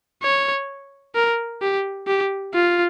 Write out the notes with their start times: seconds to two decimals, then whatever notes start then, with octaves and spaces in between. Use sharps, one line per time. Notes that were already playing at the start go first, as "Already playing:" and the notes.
0.23 C#5
1.15 A#4
1.61 G4
2.07 G4
2.54 F4